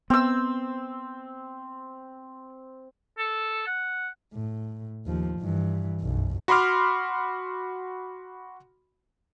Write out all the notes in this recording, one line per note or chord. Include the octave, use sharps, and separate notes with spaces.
B3 C4 E6
A4
F#5
A2
D#2 F3
G2 E3
B1 F#2
F#4 B5 C6 D6 F6